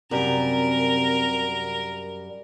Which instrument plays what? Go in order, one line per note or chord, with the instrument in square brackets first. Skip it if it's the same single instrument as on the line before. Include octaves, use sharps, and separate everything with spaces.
[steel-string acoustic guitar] F#2 G3 [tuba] C3 [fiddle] A#4